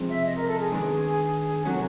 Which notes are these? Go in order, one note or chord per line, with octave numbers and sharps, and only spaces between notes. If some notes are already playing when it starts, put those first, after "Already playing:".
Already playing: C#2 C3 F3 G#3 C4
E5
D#5
A#4
A4
G#4
D#3 G#3 B3 D4
C3 D#3 F#3 A3 C#4 F#4